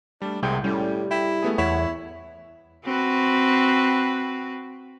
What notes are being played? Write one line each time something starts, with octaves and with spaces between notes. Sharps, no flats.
G3 A3 D4
C2 C3 G#3 G5 G6
A2 G3 C#4
E4 G5
A3 B3 G#4
E2 E4 C#5 E5 F#5
C4 F#4 B4